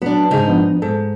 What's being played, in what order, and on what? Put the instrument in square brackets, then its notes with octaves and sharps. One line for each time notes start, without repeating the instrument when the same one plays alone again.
[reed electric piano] F#3 [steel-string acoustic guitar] B3 D4
[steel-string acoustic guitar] G#2 D#4 [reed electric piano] C#3 G#4
[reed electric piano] F3 B3 D4
[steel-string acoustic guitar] G#2 [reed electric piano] A4